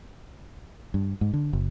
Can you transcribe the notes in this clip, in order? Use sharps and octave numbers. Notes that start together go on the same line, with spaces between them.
G2
G#2
D3
F#1